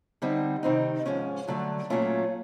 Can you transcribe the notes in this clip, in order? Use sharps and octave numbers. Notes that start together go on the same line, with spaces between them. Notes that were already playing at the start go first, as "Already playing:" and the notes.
D3 G3 C4 D#4
C3 D#3 G3 C4 D#4
G#2 F3 G#3 C#4
G2 D3 F#3 A3
A#2 F#3 A3 C#4 F4